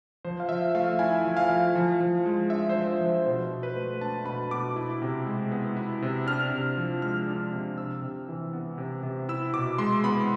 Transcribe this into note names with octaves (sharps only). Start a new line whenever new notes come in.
F3 C5
F5
F3 E5
A3 F5
E4 G#5
F3
F5
F3
F3
F3
G#3
D4 E5
C5
F3
C5
F3
C5
B2 C5
B2
B4
A3
D4 A5
B2 B5
B2 D6
E4
C3
G#3
B3
E4
C3
D4 F6
C3
F3
G#3 F6
D4
C3
C3 E6
C3
E3
B3
C3
C3
E4 E6
B2 D6
G#3 C6
B3 B5